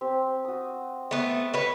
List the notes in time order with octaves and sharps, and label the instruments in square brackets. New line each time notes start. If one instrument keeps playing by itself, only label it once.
[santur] C4 G4
F#4 D#6
[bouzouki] A3 B3
B4 C#5